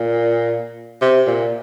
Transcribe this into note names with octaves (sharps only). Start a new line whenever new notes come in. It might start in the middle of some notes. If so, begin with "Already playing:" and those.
Already playing: A#2
C3
A#2